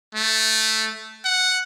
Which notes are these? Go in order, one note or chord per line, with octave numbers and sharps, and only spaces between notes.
A3
F#5